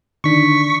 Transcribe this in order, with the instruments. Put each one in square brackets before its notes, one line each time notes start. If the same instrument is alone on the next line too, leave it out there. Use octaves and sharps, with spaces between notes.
[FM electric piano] D3 D#3 D4 [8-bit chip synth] C#6 B6